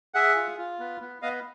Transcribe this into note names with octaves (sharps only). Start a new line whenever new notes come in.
G#4 E5 F#5
F4
F4
B3
B3
B3 D#5 F5